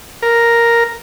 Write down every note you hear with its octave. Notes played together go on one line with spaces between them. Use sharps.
A#4